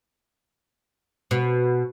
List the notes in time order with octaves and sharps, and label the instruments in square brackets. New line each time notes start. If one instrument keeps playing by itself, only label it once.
[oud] B2